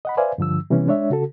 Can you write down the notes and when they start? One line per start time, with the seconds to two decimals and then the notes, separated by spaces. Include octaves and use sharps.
0.05 D#5 F#5 B5
0.17 B4 C5 D5 E5 F5 G#5
0.38 G2 D3 F3 E6
0.70 C3 E3 G3 B3 C#4
0.88 G#3 D4 C#5 E5
1.10 C#3 F#4 A4